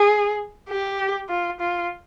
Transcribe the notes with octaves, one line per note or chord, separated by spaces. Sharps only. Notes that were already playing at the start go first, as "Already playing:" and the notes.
Already playing: G#4
G4
F4
F4